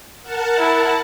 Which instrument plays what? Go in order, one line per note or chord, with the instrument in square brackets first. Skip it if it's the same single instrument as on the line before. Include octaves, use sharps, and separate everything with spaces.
[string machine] A#4 F#5 A5
[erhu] E4